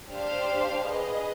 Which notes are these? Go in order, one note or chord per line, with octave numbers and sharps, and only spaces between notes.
D4 G4 C5 F5
G#4 B4 D#5